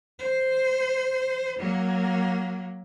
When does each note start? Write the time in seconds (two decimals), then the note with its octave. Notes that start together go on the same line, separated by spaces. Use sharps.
0.19 C5
1.59 F#3 A#3